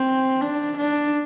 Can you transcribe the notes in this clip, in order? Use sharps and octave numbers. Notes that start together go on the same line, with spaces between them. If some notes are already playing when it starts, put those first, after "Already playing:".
Already playing: C4
D4
D4